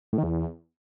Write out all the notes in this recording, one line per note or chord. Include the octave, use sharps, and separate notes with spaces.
A2
D#3
E2